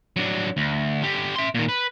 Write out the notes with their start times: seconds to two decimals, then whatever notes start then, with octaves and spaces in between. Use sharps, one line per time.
0.16 F#3 D4
0.57 D2
1.02 D3 G4
1.36 E5 C6
1.55 A#2 D#3
1.69 B4